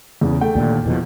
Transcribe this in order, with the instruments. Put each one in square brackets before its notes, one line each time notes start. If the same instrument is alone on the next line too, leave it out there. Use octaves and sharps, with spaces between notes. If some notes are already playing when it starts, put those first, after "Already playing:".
[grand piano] E2 C#3 E3
A3 G5
[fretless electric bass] D#2 A#2 D3
[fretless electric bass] E2 B2 F3 [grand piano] E3